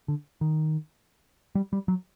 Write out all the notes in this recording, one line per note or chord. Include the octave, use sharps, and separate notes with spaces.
D3
D#3
G3
G3
F#3